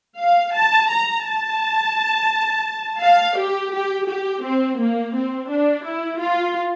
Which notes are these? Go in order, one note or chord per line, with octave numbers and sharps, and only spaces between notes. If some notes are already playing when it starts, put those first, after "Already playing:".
F5
A5
A#5
A5
F5
G4
G4
G4
C4
A#3
C4
D4
E4
F4